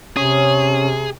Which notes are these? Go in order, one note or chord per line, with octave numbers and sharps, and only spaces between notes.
C3 C#4 G#4